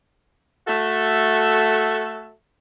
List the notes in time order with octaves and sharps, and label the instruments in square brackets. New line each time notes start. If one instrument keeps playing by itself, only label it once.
[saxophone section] A3 F#4 A4 E5